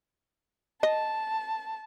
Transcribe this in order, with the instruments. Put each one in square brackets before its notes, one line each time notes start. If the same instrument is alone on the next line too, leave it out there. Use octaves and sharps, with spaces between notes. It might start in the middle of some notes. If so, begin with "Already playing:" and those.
[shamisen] D#5 [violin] A5